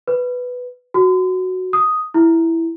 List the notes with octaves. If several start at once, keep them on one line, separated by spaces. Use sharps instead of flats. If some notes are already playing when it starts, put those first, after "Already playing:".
B4
F#4
D#6
E4